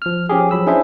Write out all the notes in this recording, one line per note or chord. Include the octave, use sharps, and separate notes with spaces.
F3 F6
F3 C#4 G4 G#4
F3 F#3 B5 E6
C#4 D4 E4 G#4 C5 E5